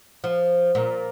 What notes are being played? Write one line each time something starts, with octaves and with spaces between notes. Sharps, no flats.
F3
A#2